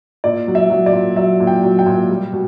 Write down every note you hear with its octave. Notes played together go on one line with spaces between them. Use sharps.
A#2 D5
F#3
E5
F#3
D5
A#2
F#3 E5
A#2
G5
F#3
G5
A#2
G3
B2